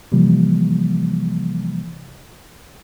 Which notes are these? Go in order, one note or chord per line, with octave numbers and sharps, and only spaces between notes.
C3 E3 F3 G3 A#3